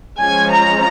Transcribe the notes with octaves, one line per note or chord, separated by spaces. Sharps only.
F3 G#3 C#4 G#5
A#5